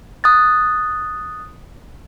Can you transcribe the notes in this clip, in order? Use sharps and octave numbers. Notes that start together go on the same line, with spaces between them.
D#6 F#6 A6